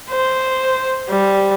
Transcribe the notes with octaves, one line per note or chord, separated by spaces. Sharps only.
C5
G3